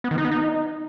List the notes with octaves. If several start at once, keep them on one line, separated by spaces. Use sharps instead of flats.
B3
D#3
D#4
B3
D#4